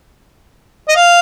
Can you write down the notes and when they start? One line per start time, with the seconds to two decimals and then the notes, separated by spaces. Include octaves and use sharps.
0.89 D#5
0.96 F5